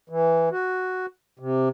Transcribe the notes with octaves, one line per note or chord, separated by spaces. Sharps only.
E3
F#4
C3